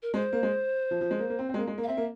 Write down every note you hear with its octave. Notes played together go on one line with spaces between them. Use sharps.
A#4
G#3 C5
A#3
G#3
F3
F3
G#3
A#3
A#3
C4
C4
G#3
A#3
G#3
A#3
F5
C4 E5
A#3